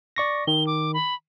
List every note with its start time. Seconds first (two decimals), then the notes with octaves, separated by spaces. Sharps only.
0.16 D5 C#6 A#6
0.47 D#3 G7
0.67 D6
0.94 B5